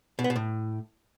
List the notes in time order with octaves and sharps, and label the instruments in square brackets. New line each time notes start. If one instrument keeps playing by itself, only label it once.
[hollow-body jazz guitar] B2
B3
B2
A2